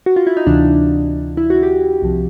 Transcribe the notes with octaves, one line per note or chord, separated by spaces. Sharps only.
F#4
F4
E4
D#4
D2 C3 E3 D4
E4
F#4
G4
C2 C3 F3